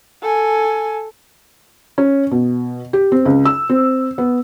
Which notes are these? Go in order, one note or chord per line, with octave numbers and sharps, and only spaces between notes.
A4 G#5
C#4
B2
G4
C4
C#2
E6
C4
B3